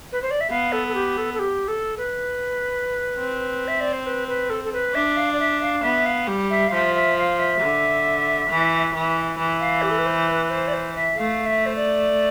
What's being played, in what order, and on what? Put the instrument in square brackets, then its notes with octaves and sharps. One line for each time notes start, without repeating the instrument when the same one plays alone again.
[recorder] B4
C5
D5
E5
[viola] B3 [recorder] F5
[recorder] A4
A4
G4
A4
A4
G4
A4
B4
[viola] C4
[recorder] E5
D5
C5
B4
B4
A4
A4
B4
[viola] D4 [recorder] E5
[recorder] F5
D5
E5
F5
[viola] B3 [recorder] E5
[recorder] F5
[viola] G3
[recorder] E5
F5
[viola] F3 [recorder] E5
[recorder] E5
F5
E5
[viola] D3
E3
E3
E3
[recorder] F5
G4
A4
B4
C5
B4
C5
D5
C5
E5
[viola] A3 [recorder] F5
[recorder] E5
C5
D5